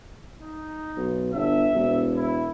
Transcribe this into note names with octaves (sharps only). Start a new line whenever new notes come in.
D#4
B1
G1 E5
E1
E4